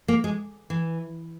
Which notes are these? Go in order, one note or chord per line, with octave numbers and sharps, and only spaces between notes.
A#3
G#3
E3